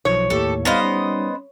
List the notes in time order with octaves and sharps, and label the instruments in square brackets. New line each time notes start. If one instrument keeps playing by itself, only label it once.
[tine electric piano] B1 F3 [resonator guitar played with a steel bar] C#5
[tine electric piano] D#2 A2 [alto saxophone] G4 [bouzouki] A4
[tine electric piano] G3 D#4 [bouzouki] B3 C5 D#5 [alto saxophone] F5
[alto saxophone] C#4